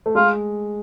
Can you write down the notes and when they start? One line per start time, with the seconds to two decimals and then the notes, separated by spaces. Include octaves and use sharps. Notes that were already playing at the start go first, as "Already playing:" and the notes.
0.06 A3
0.15 G#3 F4